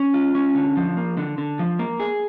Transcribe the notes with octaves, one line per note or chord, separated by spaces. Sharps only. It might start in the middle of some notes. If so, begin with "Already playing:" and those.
Already playing: C#4
F4
C#4
D3
F3
A#3
D3
D3
F3
A#3
G#4